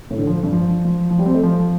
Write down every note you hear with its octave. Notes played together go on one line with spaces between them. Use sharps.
A2
D3
F3
G2
F3
F3
F3
G3
C4
A3
F3